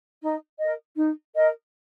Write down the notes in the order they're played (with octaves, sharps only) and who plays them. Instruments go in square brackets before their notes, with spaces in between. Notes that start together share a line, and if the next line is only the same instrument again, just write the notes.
[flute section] D#4
A#4 D#5
D#4
A#4 D#5